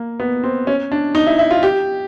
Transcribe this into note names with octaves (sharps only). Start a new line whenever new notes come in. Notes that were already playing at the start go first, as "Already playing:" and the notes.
Already playing: A#3
B3
C4
C#4
D4
D#4
E4
E4
F4
G4